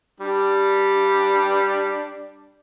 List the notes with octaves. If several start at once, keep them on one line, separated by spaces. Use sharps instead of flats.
G3 D4